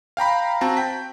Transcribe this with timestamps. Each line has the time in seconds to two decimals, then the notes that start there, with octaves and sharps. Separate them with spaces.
0.17 F5 G5 A#5 B5
0.61 C4 F#4 A5 A#5
0.77 G5 B6